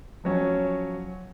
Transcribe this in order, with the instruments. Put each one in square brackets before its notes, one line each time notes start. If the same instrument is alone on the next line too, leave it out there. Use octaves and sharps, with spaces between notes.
[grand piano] F3 F#3 C#4